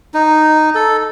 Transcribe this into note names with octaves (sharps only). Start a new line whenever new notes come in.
D#4
A4